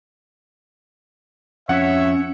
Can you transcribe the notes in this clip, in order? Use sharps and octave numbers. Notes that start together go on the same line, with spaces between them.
F2 C#4 C#5 E5 F#5